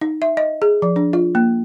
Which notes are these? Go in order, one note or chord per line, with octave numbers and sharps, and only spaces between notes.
D#4
E5
D#5
G#4
F3
D4
F4
A#3